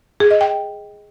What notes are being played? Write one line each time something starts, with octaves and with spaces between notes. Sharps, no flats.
G#4
D#5
G5